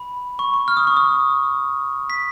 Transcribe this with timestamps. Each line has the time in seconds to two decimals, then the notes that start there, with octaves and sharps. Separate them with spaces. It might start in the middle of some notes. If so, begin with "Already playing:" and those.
Already playing: B5
0.39 C#6
0.54 C#6
0.68 F6
0.77 D#6
0.87 C#6
0.97 D#6
2.10 B6